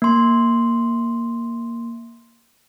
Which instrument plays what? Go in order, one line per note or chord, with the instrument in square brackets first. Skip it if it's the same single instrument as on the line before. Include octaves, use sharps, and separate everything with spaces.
[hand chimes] A#3 C6